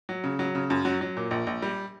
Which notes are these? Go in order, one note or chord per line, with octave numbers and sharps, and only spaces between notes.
F#3
C#3
F#3
C#3
F#2
F#3
F#3
A#2
A#1
A#1
G3